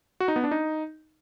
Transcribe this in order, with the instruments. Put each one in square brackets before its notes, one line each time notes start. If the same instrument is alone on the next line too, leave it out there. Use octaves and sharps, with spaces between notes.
[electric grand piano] F#4
D#4
B3
D4
D#4